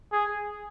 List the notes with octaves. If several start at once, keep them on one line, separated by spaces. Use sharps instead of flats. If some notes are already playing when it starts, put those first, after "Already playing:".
G#4